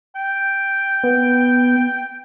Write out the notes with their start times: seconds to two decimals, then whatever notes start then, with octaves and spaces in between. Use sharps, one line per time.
0.16 G5
1.03 B3